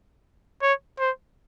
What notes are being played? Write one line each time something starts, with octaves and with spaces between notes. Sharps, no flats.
C#5
C5